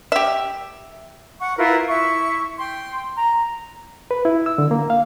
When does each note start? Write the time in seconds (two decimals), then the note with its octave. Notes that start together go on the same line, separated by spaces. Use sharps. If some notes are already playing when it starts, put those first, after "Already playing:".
0.12 G4 E5
1.40 F#5 C#6
1.58 E4 F4 A#4 B4
1.88 E4 E5 C#6
2.58 G5 C6
3.16 A#5
4.11 B4
4.25 E4
4.46 E6
4.58 D3
4.71 A#3
4.90 F5